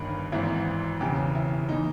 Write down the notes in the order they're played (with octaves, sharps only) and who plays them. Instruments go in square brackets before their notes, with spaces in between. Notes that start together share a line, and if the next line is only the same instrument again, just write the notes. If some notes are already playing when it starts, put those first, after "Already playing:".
Already playing: [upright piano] G1 G2 D#3 D#4
G#1 G#2 E3 E4
E1 E2 C#3 E3 G4
E4
E3 D#4